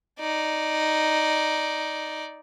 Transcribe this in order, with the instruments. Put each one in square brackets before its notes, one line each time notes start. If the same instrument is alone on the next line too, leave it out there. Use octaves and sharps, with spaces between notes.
[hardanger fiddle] D#4 D5